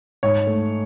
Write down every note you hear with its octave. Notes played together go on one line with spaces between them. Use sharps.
G#2 C#5
A3